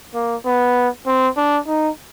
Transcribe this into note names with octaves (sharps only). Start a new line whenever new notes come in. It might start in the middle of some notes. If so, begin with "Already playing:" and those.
A#3
B3
C4
D4
D#4